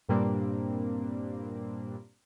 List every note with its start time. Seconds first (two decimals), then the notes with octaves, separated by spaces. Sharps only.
0.09 G2 A#2 G3 A#3 C4 D4